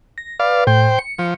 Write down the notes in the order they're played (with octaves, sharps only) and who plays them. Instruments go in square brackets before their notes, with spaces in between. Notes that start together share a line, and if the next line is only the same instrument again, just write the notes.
[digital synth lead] A#6
[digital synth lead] B4 [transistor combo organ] D5 F5
[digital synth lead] A2 [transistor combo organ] C5 G5
[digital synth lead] C#7
[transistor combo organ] F3